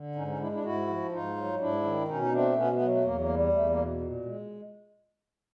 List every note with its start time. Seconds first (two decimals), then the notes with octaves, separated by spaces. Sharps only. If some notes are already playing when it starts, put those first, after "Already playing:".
Already playing: D3
0.15 G#2 C#4 D#4
0.27 C#4 D#4
0.39 G#3 D4 E4
0.52 D4 E4
0.63 G#2 E4 F#4
0.88 F3
1.11 G#2 D#4 F4
1.36 F#3
1.60 G#2 D4 E4
1.84 D#3
2.08 B2 C#4 D#4
2.22 D#4
2.32 A3 C4 D4
2.56 B2 B3 C#4
2.72 A3 B3
2.81 F#3
2.89 A3
3.04 E2 A#3
3.21 A#3
3.28 G3
3.53 E2 A3
3.69 A#3
3.77 B2
4.01 A#2
4.25 G#3